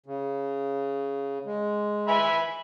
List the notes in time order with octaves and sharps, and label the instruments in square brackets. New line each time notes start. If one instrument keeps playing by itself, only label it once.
[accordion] C#3
G#3
[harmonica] E5 G#5 B5